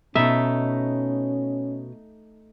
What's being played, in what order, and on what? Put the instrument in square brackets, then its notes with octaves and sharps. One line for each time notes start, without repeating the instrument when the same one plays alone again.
[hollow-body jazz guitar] B2 [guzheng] A3 D#4 [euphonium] C#4 [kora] E5